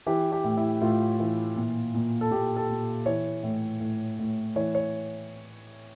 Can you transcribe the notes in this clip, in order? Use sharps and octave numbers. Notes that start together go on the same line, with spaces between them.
E3 G4
G4
A2
E4
A2 F4
E3
A#2
A#2
A4
A#2 G4
A4
A#2
E3 C#5
A2
A2
A2
E3 C#5
C#5